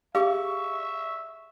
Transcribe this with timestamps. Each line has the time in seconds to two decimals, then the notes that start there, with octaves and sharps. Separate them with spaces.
0.15 G4 G#4 E5 F5 C#6